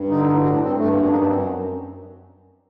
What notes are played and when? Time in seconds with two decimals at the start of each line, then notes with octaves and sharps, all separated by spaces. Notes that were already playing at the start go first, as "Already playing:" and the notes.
Already playing: G2
0.09 D3 D#4
0.26 A2 D#4
0.43 A2 F#4
0.51 D4
0.60 G2 C4
0.76 G2 A3
0.93 F#2 A#3
1.02 D4
1.10 F#2 D#4
1.19 D4
1.27 F#2 C4